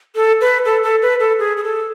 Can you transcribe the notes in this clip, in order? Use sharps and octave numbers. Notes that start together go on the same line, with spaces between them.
A4
B4
A4
A4
B4
A4
G#4
G#4
A4